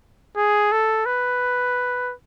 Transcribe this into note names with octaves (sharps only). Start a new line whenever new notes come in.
G#4
A4
B4